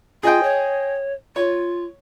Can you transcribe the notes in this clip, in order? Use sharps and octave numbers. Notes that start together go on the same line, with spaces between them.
F4 G#4 D#5 G5
C#5
F4 C#5